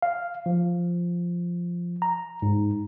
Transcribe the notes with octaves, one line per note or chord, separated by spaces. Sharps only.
F5
F3
A#5
G#2